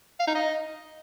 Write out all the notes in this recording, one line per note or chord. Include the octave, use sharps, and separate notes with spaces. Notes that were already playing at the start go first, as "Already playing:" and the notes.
F5
D#4
D#5